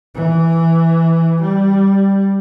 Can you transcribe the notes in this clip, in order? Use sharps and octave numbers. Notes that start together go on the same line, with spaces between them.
E3
G3